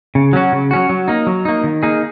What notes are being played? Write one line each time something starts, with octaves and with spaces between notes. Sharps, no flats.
C#3
F#3 C#4 F#4
C#3
F#3 C#4 F#4
F#3
A#3 D#4
F#3
A#3 D#4
D#3
A#3 D#4 G#4